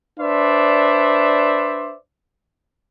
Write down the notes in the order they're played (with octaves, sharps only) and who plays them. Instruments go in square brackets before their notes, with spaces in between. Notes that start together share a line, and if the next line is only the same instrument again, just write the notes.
[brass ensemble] D4 B4 C5 D5 E5